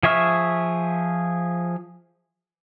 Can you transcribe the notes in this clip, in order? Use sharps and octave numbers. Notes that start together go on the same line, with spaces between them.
F3 G#4 E5 C#6 F6